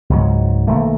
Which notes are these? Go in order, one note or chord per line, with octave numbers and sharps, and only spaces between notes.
C#2 G#2 F#3
B1 D#3 A3 A#3